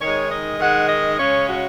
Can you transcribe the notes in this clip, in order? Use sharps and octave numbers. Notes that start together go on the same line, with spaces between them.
D#3 G#3 D#4 C#5
D#5
D#3 G#3 D#4 F#5
D#5
C#3 G#3 C#4 C#5
F#4